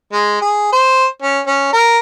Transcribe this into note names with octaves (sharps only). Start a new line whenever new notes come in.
G#3
G#4
C5
C#4
C#4
A#4